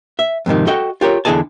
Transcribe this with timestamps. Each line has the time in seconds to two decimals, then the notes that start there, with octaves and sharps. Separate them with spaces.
0.19 E5
0.46 F2 G#2 C3 D#3
0.67 F#4 A4 D#5 F#5 G5
1.01 F4 G4 A#4 C#5
1.25 E2 D3 E4 G#4 D#5 A5